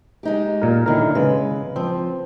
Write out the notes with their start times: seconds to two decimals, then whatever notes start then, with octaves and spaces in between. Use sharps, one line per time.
0.23 G#3 D#4 G4
0.62 A#2 A#4
0.86 F#2 D3 D#3 E4 A#4
1.15 C#3 G#3 B4
1.76 F3 C4